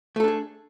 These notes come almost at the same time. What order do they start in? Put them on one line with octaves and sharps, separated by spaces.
A3 A4 D4 G#4